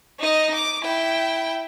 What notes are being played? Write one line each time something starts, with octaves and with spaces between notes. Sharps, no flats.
D#4 D#5
D6
E4 G5